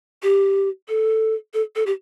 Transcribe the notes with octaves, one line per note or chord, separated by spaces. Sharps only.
G4
A4
A4
A4
G4